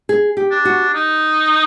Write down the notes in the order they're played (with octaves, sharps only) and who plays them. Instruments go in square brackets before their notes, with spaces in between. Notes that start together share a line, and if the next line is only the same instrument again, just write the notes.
[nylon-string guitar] G#4
G4
[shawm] D4
[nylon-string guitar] F#4
[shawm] D#4